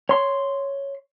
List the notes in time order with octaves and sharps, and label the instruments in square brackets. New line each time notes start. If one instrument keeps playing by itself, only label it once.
[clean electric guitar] C#5 C6